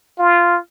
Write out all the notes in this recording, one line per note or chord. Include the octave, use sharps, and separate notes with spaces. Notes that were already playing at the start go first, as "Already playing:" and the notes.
F4